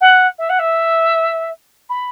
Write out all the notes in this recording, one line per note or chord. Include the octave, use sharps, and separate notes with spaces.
F#5
E5
F#5
E5
B5